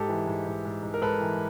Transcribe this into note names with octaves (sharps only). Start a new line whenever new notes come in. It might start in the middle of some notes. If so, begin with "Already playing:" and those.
Already playing: G#2 G4 A4
E3
G#2
G#2
G#2
G#2
A#4
G#2 A4 B4
E3